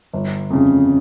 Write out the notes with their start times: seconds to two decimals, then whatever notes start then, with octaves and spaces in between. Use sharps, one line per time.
0.13 G1
0.50 F2 C#3